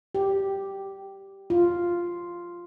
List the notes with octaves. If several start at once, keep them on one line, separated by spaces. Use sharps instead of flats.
G4
F4